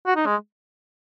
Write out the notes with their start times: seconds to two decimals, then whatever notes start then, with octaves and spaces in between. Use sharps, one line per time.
0.07 F#4
0.16 D#4
0.26 G#3